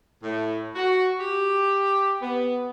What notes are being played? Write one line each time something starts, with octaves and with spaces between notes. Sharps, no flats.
A2
F#4
G4
B3